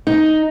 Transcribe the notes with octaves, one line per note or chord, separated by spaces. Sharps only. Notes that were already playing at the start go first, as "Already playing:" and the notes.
D#4